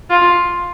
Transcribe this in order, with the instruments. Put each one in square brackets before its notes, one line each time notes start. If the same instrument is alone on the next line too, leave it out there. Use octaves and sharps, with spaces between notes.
[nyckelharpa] F4